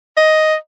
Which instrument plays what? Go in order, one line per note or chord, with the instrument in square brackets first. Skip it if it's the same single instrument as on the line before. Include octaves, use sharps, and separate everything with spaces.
[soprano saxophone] D#5